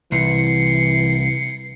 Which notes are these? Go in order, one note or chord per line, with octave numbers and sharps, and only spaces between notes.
C2 E3 C7 C#7